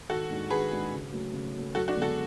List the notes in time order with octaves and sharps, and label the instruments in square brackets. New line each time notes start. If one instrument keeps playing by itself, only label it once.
[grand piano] G#1 [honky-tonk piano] F#4 A4
[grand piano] G#2 G#3 D4 F#4
[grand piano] G#1 [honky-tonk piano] G#4 B4
[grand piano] G#2 G#3 D4 F#4
C#3
F#3 A3
C#3
F#3 A3
[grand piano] F#2 [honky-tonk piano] F#4 A4
[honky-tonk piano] D4 F#4
[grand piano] D3 G#3 B3
[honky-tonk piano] F#4 A4